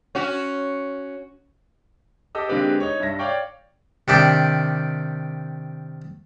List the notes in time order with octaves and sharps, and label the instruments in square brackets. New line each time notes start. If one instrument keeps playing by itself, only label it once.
[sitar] C#4 F#4
[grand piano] G4 A4 D#5 D6 E6
D3 G#3 A#3 C4 G4 B4
D#4 C#5
G2 E5 A#6
C#5 D5 F5 G5 C#6
[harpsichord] C3 D#3 D4 G4